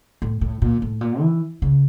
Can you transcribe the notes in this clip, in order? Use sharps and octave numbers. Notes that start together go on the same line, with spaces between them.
A2
A2
A#2
A2
A#2
E3
C#3